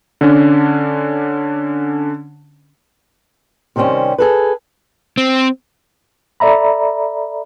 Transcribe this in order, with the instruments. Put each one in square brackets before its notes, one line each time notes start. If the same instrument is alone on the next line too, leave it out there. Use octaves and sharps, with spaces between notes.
[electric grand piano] D3 C#4 D4
[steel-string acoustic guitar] C3 D#3 G3 C4 C#4
G#4 A4 B4
[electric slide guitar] C4
[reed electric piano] A4 D5 E5 A#5 B5